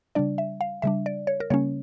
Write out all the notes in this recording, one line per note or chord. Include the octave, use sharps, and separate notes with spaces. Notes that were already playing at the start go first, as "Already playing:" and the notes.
C#3 G3 D4 D5
E5
F5
C#3 G3 D4 E5
D5
C#5
A#4
C#3 G3 A#3 C#4 C#5